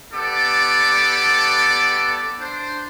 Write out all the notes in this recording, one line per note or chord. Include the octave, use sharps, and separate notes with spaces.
B3 G4 A4 D5 D6
D4 C5